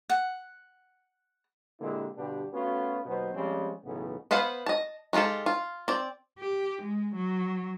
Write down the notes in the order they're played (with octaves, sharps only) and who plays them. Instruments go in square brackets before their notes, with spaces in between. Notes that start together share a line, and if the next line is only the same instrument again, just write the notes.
[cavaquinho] F#5
[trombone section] A#2 D3 G#3 A#3 E4 G4
G2 B2 D3 D4 G4
A3 B3 C#4 F4 F#4
D#2 B2 F#3 B3 D#4 C5
F3 G3 G#3 C4 C#4
B1 A2 C#3 E3 B3 G#4
[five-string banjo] B3 B4 C5 F5 F#5
D#5 A5
G#3 D#4 F4 G4 A4
F4
C4 D5
[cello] G4
G#3
F#3